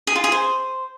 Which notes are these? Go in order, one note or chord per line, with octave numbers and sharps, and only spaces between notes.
G#4
F4
G#4
C5